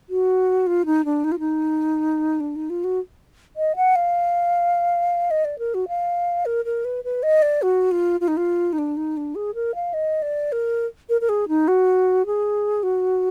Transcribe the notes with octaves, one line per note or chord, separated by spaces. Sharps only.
F#4
F4
D#4
D4
D#4
F4
D#4
D4
D#4
F4
F#4
D#5
F#5
F5
D#5
D5
A#4
F#4
F5
A#4
A#4
B4
B4
D#5
D5
F#4
F4
F4
D#4
F4
D#4
D4
D#4
D4
G#4
A#4
F5
D#5
D5
A#4
A#4
A#4
G#4
D#4
F#4
G#4
F#4